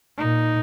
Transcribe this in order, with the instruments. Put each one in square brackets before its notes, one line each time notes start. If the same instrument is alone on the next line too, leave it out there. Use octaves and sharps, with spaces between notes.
[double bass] A#2 [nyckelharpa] D#4